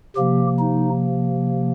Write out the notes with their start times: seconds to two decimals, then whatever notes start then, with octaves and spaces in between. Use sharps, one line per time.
0.16 C3 F3 A#3 G4
0.59 D#4